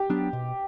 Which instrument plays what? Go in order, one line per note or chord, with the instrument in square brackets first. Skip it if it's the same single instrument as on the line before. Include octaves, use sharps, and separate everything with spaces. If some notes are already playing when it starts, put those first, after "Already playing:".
Already playing: [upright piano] G4
[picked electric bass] F#3 B3 D4
B2